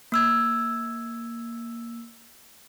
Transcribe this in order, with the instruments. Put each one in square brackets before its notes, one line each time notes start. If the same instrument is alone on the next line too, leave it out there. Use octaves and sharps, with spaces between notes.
[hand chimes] A#3 E6 G#6